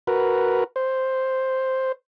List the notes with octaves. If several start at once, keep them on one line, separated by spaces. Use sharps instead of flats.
F#4 A#4 B4
C5